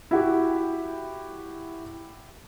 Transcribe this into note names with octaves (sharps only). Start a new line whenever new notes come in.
E4 F#4 G4